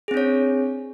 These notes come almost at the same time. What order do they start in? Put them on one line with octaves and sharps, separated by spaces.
G#4 C4 D4 C#5